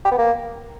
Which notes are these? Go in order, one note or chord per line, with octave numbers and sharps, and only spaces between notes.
G4
B3
A#3